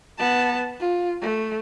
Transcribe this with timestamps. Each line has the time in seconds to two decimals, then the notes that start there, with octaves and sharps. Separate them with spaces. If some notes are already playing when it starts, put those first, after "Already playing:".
0.18 B3 A5
0.80 F4
1.21 A3